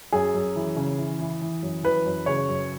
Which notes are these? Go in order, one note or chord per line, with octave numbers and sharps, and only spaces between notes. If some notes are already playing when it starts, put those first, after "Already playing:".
F#2 G#4
F#2
E3
C#3
E3
E3
E3
F#2
E3 B4
F#2
C#3 C#5
F#2